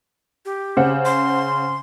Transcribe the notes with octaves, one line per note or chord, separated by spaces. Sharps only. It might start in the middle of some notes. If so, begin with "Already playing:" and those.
G4
C#3 C5 F#5
C6